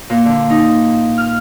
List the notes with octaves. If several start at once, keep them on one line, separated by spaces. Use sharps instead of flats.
A#2
D3
D#4
F6